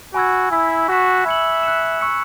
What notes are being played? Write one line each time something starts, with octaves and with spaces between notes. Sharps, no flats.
F#4 G#5 B5 E6 G#6
E4 G#5 E6 B6
F#4 C#6 F#6 B6 E7
E5 B5 G#6 C#7 F#7
F#6 C#7 E7
C#6 E6 C#7